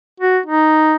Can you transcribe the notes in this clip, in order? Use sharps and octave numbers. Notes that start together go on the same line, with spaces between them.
F#4
D#4